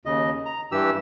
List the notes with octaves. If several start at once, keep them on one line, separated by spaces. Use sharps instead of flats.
D#2 C#3 D#5
A#5
G2 E3 G4 E6